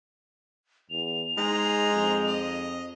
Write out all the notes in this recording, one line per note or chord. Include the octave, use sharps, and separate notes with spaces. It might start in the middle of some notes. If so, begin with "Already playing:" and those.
E2 F7
G#3 D#4 C5 G#5 A#5
F2
D#5